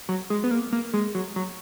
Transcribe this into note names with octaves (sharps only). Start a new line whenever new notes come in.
F#3
G#3
B3
A#3
A#3
G#3
F#3
F#3